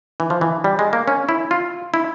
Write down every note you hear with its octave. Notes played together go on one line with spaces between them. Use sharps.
E3
F3
E3
G3
G#3
A#3
C#4
E4
F4
E4